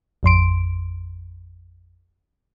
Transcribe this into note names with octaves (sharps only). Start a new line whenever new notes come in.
A1 F2 C6 D7